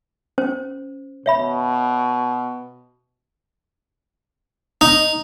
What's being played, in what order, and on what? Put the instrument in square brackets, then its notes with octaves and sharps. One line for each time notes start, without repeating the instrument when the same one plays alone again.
[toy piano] C#4 C5
[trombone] B2 [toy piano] C#5 E5 B5
[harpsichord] D#4